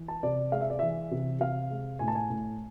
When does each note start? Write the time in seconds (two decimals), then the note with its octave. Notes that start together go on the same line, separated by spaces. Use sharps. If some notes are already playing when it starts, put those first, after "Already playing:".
Already playing: E3
0.08 A5
0.23 C3 D5
0.52 G#3 F5
0.61 E5
0.70 D5
0.79 E3 E5
1.11 C3
1.40 C3 F5
1.70 G#3
1.99 A2 G#5
2.08 A5
2.15 G#5
2.30 A2